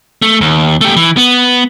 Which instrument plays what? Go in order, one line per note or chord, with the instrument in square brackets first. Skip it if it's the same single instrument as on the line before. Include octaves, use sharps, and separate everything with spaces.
[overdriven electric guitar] A3
D#2
A3 G4
E3
B3